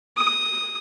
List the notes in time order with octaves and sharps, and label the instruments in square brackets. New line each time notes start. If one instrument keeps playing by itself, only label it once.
[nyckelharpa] D#6